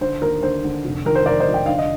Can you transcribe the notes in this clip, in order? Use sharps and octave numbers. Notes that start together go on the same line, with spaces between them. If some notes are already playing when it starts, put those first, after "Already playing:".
D3 C5
D#2 A#4
D3 C5
D3
F1
D#3 A#4
C5
F1 A#4 D5
C5 D#5
F1
G5
D3 F5
D#5